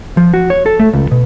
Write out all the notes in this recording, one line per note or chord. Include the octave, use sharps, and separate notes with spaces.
F3
F#4
C#5
A4
A3
C#2
B2